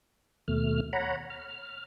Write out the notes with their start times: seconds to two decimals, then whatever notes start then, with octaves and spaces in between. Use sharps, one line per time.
0.48 D#2 B2 A3 F6
0.93 C#5 F#5 A#5 B5
1.30 F6